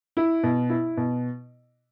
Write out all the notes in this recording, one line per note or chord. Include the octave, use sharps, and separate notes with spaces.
E4
B2
E4
B2